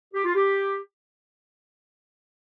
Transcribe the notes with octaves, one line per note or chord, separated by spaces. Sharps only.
G4
F4
G4